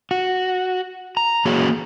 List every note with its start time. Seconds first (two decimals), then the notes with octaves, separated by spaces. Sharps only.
0.11 F#4
1.17 A#5
1.45 E3 A#3 C#4 F#4 G#4